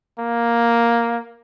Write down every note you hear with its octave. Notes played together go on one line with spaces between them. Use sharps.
A#3